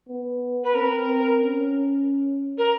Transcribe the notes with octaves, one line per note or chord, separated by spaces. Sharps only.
B3
B4
C4 A#4
C#4
A#4